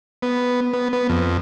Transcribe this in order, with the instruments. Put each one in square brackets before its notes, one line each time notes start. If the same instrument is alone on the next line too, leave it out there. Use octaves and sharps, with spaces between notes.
[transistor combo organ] B3
B3
B3
F2